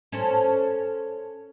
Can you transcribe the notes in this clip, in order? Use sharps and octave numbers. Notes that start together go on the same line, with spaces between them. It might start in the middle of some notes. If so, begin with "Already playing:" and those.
C#4 A4 C5